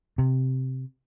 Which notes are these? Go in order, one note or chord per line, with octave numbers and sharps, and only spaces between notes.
C3